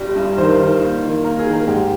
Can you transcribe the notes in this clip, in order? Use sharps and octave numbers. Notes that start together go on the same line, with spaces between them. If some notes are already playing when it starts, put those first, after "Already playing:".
Already playing: G1 G3
G2
D#3 C5
D#3
A#3
D#3
A#3 A#4
G#4
D#3
A#4
G#2 G4